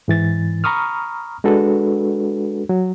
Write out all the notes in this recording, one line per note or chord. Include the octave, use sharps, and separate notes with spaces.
G#2 E3 A6
A#5 B5 C#6 D#6 F6
G#3 D4 F#4 A4 B4
F#3